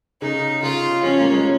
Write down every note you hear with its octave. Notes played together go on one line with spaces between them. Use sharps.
C#3 D#4
C#3 F4
F3 C#4
A#3
G#3